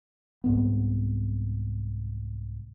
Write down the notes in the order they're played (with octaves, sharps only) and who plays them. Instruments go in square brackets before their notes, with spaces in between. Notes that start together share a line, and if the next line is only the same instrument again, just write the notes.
[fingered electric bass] C2 G#2 B3